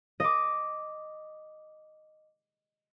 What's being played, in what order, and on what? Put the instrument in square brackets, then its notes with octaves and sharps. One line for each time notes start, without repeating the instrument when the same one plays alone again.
[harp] D#5 D6